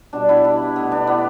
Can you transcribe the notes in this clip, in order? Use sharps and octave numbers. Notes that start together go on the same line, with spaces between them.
B2 G3 D4
B3 E4
D4
B2 A3 B3
D4
B3 E4